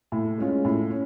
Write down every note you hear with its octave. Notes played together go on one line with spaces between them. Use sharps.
A2
G#3 C#4 F4
A2
C#4